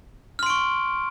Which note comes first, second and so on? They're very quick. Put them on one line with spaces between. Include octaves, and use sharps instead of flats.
F6 C6 D7 C#6